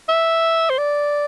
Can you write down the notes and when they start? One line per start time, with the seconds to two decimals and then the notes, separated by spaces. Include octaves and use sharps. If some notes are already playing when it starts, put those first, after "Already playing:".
0.09 E5
0.70 C5
0.78 D5